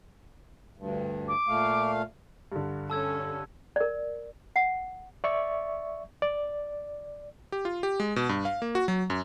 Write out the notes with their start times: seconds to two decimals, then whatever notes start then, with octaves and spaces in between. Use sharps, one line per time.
0.77 D2 G2
1.28 D6
1.48 A#2 A3 F5
2.52 G2 D3
2.90 C#4 A4 A5 E6 G#6
3.76 A#4 D5
4.56 F#5
5.24 D5 E5 C#6
6.22 D5
7.52 G4
7.65 F4
7.83 G4
8.00 G#3
8.16 B2
8.29 G2
8.45 F5
8.62 A#3
8.75 F#4
8.88 F#3
9.10 F#2